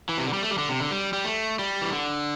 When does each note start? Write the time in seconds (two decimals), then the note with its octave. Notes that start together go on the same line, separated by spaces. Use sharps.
0.09 E3
0.18 C3
0.26 D3
0.33 G3
0.42 A3
0.51 G3
0.58 D3
0.69 C3
0.80 D3
0.91 G3
1.13 G3
1.25 A3
1.59 G3
1.82 E3
1.92 D3